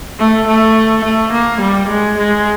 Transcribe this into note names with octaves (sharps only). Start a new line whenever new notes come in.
A3
A3
A3
A#3
G3
G#3
G#3